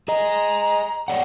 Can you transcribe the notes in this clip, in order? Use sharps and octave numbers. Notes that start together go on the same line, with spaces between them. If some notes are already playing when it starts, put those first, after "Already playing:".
G#4 D#5 A#5
C#5 D5 F#5